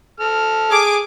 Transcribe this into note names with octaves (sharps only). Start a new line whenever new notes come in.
A4 F6
G#4 D6